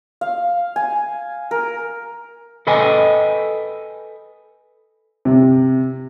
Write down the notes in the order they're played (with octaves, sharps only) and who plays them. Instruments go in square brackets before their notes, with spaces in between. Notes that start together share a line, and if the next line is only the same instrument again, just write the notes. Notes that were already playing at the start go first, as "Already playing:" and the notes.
[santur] F5
G#5
A#4
[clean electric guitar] A4 B4 D#5 G5 G#5
[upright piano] C3